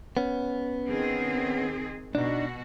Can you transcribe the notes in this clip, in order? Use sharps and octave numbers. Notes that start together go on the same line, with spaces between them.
B3 C#4
D#3 C4 G#4
B2 D4 D#4 F#4